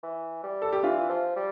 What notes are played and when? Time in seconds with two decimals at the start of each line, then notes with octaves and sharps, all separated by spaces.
0.03 E3
0.44 G3
0.62 A4
0.72 G4
0.83 E3 D4 F4
1.09 F3
1.36 G3